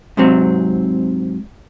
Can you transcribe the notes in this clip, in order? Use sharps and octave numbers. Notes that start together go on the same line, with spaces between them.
G#2 C3 F#3 C4